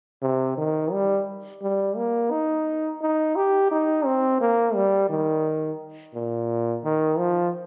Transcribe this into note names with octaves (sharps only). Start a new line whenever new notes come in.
C3
D#3
G3
G3
A#3
D#4
D#4
G4
D#4
C4
A#3
G3
D#3
A#2
D#3
F3